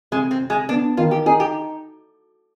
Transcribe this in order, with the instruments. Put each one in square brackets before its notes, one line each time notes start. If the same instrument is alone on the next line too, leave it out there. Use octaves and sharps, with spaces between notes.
[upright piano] C3 [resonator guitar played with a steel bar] G#3
[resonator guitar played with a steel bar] C4
[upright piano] C3
[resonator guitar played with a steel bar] G#3
[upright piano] B3 [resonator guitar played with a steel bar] D4
[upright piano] D#3 [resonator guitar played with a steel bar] F4
[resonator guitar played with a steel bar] G4
[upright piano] D#4 [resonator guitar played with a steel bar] G#4
[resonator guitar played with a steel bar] G4